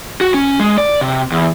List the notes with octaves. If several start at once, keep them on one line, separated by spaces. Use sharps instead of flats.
F#4
C#4
G#3
D5
C3
E2